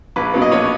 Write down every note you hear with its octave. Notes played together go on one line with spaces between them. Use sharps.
A#1 B4
A#2 F#3 B3
D#5
A#1 C#5